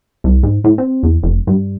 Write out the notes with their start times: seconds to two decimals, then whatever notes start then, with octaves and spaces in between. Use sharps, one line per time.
0.24 C2
0.43 G#2
0.64 A2
0.78 C4
1.03 E2
1.23 F1
1.47 G2